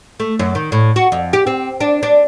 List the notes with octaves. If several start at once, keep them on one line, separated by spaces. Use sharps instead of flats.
A3
F#2
D#3
A2
F#4
F2
G4
C4
D4
D4